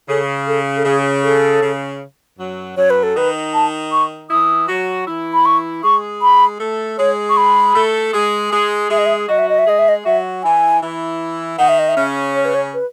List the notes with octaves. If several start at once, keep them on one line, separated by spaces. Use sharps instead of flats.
C#3 A4
A4
A4
C#3 G#4
A4
C#3
F#2 F#3
F#2 F#3 C#5
B4
A4
D#3 D#4 B4
A5
C#6
E3 E4 D#6
F#3 F#4
E3 E4
B5
C#6
G#3 G#4 C#6
B5
A3 A4
G#3 G#4 C#5
C#6
B5
A3 A4
G#3 G#4
G#3 G#4
G#3 G#4 E5
D#5
E5
F#3 F#4 D#5
E5
D#5
E5
G#3 G#4 D#5
E5
D#5
F#3 F#4 E5
E3 E4 G#5
E3 E4
D#3 D#4 F#5
E5
D#5
E5
C#3 C#4
C#5
B4
C#5
B4